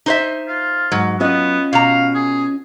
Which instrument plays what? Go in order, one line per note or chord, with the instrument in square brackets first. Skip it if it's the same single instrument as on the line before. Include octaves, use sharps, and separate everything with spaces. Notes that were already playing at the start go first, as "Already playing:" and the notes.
[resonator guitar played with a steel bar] D#4 C5 E5
[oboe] F4
[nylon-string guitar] G#2 [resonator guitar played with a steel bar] F#3
[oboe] B3 [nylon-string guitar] C#4 F4 D#5
[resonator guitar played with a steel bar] B2 A#5 [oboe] F5
[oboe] G#4